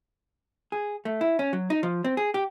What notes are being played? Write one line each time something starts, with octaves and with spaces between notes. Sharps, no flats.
G#4
A3
E4
C#4
F#3
D#4
F3
C4
G#4
G4